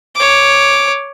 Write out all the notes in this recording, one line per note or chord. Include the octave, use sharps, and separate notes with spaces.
C#5 D6